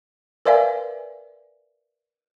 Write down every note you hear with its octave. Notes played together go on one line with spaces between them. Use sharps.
A#4 B4 D5 E5 F5 G#5